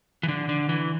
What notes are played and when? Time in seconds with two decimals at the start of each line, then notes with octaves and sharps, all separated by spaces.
0.23 E3
0.28 D3
0.49 D3
0.69 E3